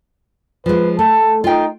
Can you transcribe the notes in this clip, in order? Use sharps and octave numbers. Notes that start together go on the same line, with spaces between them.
F3 G#3 B4
A3 A5
D#4 F4 G5